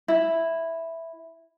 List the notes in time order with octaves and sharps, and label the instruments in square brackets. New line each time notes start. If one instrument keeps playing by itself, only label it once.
[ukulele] E4